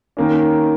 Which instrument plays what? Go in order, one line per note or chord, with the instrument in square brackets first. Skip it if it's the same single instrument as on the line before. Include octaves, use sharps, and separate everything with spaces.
[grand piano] D#3 A#3 C#4